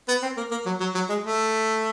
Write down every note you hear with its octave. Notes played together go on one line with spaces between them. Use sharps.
B3
C4
A#3
A#3
F#3
F#3
F#3
G#3
A3